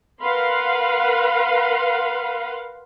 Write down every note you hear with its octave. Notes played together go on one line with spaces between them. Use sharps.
A#4 B4 F5 F#5 B5 C6